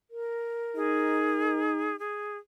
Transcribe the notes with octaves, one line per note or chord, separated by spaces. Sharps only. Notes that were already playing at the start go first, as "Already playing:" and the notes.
A#4
D#4 G#4
G#4